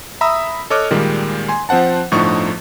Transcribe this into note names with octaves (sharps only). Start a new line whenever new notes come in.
E5 A#5 B5 D#6 E6
A4 C#5 D#5 D6 F6 F#6
A#2 D#3 G3 G#3 A#3
G#5 C6
F3 C4 C5 F#5 A5
G1 A2 D3 F3 D#4 C#6